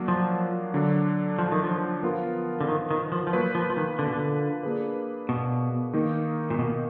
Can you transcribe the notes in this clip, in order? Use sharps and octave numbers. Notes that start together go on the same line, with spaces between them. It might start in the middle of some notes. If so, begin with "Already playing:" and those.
Already playing: F#3 A#3 D4 F#4
F3
D3 F#3 D4
F3
D#3
F3
F3 B3 F4 A#4
D3
D#3
D#3
F3
F3
F#3 A#3 F4 B4
F3
F3
D#3
D3
B2
D3
A#3 D4 G#4 B4
B2
D#3 A#3 D#4 A#4
A#2
B2